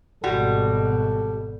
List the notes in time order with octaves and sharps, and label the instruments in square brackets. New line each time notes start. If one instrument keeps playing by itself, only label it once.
[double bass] G#1 B2 [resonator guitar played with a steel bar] G3 [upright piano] F#4 [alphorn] A4